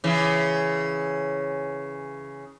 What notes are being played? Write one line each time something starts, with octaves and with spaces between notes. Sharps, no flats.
C#3 E3